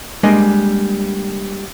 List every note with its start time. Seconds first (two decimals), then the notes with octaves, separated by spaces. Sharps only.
0.23 G3 G#3 A#3 D4 D#5